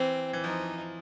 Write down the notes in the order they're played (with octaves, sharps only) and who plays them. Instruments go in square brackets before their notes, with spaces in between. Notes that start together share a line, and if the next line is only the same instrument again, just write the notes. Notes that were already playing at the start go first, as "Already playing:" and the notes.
Already playing: [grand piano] E3 [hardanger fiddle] C4
[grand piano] E3
[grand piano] F3 [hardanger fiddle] D#4